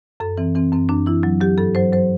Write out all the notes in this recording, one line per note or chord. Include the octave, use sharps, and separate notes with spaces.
F#2 A4
E3 C4
E3 C4
F#2 C4
F#2 D4
E3 E4
F#3
F#3 G4
G2 A4
F#3 C5
F#3 C5